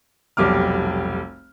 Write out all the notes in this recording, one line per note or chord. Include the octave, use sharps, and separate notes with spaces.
F1 B1 G3 D6 F6